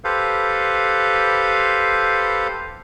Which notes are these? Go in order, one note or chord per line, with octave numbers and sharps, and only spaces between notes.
G4 A4 B4 C5 F5